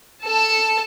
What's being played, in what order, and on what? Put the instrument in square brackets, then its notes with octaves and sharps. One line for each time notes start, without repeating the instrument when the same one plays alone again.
[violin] A4 A5